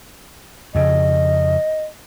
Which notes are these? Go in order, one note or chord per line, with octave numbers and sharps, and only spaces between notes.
F2 C#3 D#5